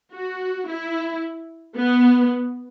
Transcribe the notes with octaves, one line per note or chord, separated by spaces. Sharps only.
F#4
E4
B3